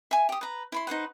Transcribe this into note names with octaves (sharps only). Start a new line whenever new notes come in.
E5 G#5
G4 D#6
B4 A#5
E4 B5 C6
D#4 B4 C5 F#5